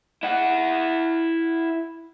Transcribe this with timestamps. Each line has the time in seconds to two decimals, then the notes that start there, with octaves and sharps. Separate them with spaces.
0.23 E4 F#5